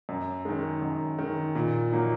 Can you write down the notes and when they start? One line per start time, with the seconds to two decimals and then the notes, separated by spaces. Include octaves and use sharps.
0.09 F#2
0.45 D#3 G#3
0.82 F#2
1.18 D#3 G#3
1.55 A#2
1.91 F#3 A#3 D#4